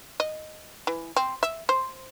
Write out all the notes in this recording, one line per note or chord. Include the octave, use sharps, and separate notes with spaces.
D#5
E3
C4
E5
C5